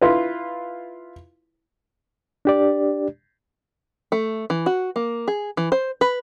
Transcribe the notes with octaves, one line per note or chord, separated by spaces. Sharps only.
E4 F4 B4
D4 G4 D5
A3
E3
F#4
A#3
G#4
E3
C5
B4